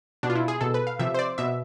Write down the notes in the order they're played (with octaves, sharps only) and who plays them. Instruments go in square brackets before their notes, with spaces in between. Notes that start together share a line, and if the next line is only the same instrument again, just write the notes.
[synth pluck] B2 D4
F4
E4
G#4
B2 A4
B4
F5
C3 F3 E5
C5
D5
B2 E5